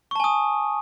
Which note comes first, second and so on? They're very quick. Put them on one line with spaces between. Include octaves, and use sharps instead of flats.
C#6 A5 G#5 D#6